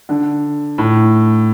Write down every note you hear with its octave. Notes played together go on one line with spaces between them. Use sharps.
D3
A2